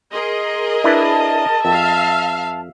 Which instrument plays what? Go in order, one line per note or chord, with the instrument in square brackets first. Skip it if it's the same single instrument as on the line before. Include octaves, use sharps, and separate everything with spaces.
[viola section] G#4 A#4 D#5 [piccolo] C6
[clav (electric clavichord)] D4 E4 B4 [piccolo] A5
[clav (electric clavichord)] F2 [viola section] E5 F5